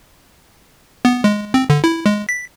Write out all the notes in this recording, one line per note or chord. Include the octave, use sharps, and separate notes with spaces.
B3
G#3
C4
D3
E4
G#3
B6